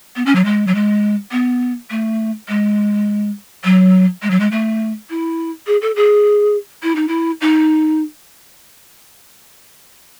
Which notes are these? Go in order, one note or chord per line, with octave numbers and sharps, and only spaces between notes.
B3
C#4
F#3
G#3
F#3
G#3
B3
A3
G#3
F#3
G#3
F#3
G#3
A3
E4
G#4
A4
G#4
E4
D#4
E4
D#4